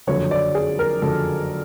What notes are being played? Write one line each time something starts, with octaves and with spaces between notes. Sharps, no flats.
F#1 F2 D3 F#3 C#5
D5
G#4
A#4
F#1 F2 D3 F#3 A4